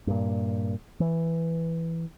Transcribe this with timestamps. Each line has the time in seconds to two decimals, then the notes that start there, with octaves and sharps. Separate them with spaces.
0.07 G2 A#2
1.00 E3